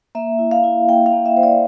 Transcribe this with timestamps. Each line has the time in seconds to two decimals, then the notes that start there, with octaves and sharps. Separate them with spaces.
0.15 A#3 E5
0.39 E4
0.51 F5
0.64 E4
0.88 A#3 G5
1.06 F5
1.13 A#3
1.26 E5
1.37 E4 C5
1.43 D5